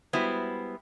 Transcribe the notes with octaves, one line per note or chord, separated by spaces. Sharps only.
G3 G#3 B3 E4 F#4 C5